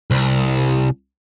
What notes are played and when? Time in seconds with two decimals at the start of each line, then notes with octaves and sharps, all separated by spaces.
0.11 C2